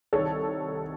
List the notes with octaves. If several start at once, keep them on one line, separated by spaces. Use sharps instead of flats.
C2 C3 D#3 A4 C#5